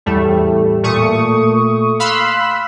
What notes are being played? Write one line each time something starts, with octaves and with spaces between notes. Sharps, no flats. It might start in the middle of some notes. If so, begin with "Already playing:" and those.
E2 A2 G3 A3
A#2 A3 C#6 D#6
F5 B5 C6 E6 F#6